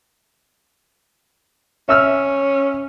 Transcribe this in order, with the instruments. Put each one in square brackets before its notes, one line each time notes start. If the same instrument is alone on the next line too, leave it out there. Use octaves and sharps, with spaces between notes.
[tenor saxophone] C#4 [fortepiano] E5 E6 F6